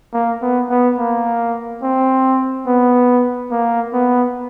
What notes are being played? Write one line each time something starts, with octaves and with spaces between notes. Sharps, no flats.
A#3
B3
B3
A#3
C4
B3
A#3
B3